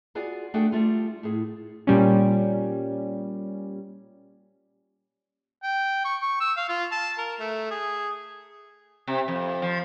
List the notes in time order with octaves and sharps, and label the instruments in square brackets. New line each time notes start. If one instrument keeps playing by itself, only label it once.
[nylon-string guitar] F4 F#4 G#4 D5 G#5
A3 D4 F#4 G#4 A4 G5
G3 A3 F4
A2 G#4
[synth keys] A#2 G3 C#4
[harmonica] G5
C#6
C#6
E6
F5
F4
A5
A#4
A3
G#4
[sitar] C3
F2
F3